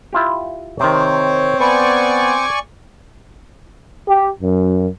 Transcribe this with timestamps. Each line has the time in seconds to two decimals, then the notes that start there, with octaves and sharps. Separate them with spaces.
0.13 E4 F4 G4
0.80 C3 D#3 C4 C5 C#5
1.60 B3 B4 D5 G#5 C#6
4.08 G4
4.41 F#2